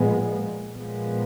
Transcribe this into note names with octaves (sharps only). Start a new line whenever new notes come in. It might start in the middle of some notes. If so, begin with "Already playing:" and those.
Already playing: A#2 F3 G#3 B3
A#2 F3 G#3 B3